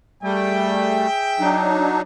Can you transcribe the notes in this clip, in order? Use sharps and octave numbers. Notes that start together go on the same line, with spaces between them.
G3 A3 G#4 E5 G5
F#3 D4 D#4